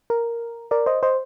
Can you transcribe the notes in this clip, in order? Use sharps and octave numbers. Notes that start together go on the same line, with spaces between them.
A#4
A#4 D5
C5 D#5
C5 D#5